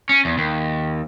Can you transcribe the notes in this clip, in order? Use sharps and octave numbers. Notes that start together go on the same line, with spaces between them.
C#4
E2
D#2